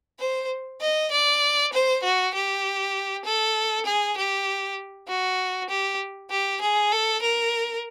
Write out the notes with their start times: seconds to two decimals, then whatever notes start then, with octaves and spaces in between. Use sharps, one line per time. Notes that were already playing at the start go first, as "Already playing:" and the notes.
0.20 C5
0.81 D#5
1.11 D5
1.73 C5
2.03 F#4
2.34 G4
3.25 A4
3.86 G#4
4.17 G4
5.08 F#4
5.69 G4
6.30 G4
6.61 G#4
6.92 A4
7.22 A#4